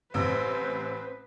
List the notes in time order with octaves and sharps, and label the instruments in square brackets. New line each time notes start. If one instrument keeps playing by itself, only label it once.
[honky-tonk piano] A1 C3 E6 [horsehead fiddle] B4 C5